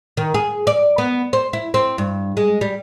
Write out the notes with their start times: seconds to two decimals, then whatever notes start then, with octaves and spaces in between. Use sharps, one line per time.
0.17 D#3
0.34 G#4
0.67 D5
0.98 B3
1.33 C5
1.53 E4
1.74 C4
1.98 G2
2.37 G#3
2.61 G3